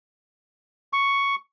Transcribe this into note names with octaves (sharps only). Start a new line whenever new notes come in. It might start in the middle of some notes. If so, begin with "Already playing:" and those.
C#6